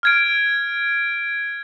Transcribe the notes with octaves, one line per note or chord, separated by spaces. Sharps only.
F6 G#6 D7